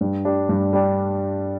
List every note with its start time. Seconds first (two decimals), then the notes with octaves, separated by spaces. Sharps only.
0.01 G2
0.25 G3 D4
0.49 G2
0.73 G3 D4